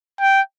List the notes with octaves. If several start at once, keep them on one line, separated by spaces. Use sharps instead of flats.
G5